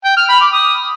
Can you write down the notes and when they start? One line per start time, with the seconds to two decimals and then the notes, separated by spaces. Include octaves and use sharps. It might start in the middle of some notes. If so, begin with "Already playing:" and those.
0.05 G5
0.17 F6
0.29 B5
0.41 D6
0.53 D#6